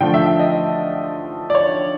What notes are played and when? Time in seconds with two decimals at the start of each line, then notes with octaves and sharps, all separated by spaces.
0.01 D3 F3 A3 G5
0.14 E5
0.26 E5
0.39 D#5
1.50 D5
1.55 C#5